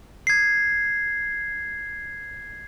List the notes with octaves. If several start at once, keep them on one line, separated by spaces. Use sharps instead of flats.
G#6 C7